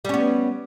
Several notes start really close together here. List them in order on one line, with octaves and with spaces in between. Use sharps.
G3 C#4 B3